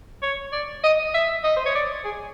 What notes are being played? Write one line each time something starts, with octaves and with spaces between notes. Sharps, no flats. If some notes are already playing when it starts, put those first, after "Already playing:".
C#5
D5
D#5
E5
D#5
C5
C#5
D5
G#4